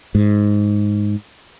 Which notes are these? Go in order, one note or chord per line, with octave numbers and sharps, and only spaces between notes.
G#2